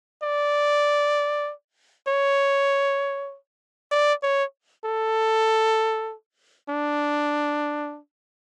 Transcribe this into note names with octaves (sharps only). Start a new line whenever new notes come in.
D5
C#5
D5
C#5
A4
D4